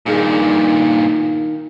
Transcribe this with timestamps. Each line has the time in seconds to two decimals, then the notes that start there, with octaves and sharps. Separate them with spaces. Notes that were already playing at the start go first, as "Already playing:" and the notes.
0.06 G2 A#2 D#3 D#4 G#4